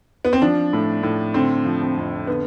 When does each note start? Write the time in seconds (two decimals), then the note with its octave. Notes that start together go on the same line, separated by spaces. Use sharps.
0.25 B3
0.33 C4
0.42 F3 D4
0.73 A2
1.03 A2
1.34 D3 C4
1.65 F3
1.82 C4
1.97 F2
2.27 D3 B3